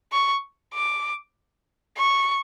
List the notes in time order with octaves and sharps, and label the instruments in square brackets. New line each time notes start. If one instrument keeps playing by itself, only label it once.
[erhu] C#6
D6
C#6